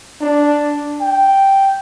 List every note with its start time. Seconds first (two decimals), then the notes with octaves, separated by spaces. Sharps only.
0.21 D4
1.01 G5